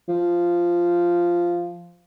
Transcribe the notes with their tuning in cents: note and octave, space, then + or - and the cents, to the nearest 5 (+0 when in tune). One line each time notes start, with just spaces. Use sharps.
F3 -10